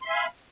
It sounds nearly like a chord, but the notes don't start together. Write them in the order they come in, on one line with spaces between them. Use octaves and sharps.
C6 E5 G#5 F5 B5